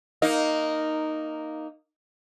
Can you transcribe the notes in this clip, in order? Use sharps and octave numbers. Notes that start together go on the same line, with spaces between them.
A#3 D#4